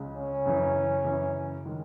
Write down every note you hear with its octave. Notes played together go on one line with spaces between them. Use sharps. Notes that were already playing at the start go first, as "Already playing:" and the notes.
Already playing: C#2 C#3 G#3
C#4
F#2 C#3 E3
F#2 C#3 E3
D#3 G#3